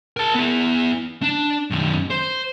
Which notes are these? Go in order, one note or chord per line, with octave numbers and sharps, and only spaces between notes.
A#4 A5
B3 E4
D4
F#2 D#3
C5